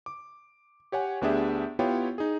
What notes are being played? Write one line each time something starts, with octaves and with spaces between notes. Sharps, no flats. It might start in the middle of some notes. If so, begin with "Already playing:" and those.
D6
G4 C#5 F#5 G#5
D2 B3 D4 G4 G#4 E5
B3 E4 F4 G4 C#5 G5
D#4 G#4